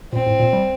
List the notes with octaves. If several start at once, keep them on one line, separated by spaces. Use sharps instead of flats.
A#2 C4
A2
A#2
G3